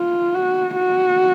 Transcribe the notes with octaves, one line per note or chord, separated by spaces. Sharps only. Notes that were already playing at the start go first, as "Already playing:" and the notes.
Already playing: F4
F#4
F#4